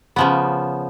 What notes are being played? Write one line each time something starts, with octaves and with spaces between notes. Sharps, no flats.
C#3 F3 B3